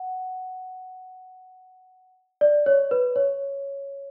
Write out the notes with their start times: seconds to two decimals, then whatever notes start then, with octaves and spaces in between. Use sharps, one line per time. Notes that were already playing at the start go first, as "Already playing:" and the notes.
Already playing: F#5
2.41 D5
2.66 C#5
2.91 B4
3.16 C#5